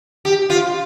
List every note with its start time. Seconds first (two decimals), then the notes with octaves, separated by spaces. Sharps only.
0.25 G4
0.50 F4